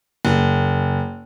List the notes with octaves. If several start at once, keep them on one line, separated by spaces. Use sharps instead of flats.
F#1